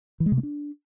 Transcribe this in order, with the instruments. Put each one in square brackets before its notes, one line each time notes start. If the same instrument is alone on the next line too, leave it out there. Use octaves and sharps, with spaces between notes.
[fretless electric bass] E3
G#3
C3
A3
D4